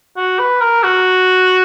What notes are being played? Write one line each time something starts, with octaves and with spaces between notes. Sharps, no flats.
F#4
B4
A#4
F#4